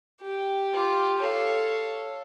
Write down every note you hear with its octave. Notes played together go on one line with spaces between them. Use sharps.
G4
F4 D6
A4 C#5 F5